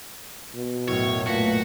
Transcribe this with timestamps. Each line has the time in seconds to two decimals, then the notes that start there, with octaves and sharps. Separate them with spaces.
0.55 B2
0.88 B1 F#2 A2 E4 C#5
1.26 A#2 A3 F#4 B4 F5